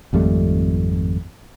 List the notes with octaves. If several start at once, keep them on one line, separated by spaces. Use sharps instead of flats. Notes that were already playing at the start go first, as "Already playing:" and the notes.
G#1 F2 G3 A3